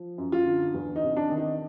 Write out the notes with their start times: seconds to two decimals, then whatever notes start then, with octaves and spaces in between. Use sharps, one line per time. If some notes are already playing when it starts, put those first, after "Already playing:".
Already playing: F3
0.18 F#2
0.32 F4
0.46 D3
0.74 E2
0.96 D#4
1.03 C3
1.17 D4
1.30 D#3
1.37 D#4